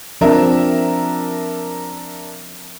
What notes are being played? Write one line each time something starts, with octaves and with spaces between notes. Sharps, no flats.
F3 C4 D4 A#4 E5